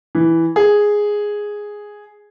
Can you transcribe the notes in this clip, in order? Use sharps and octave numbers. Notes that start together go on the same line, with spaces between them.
E3
G#4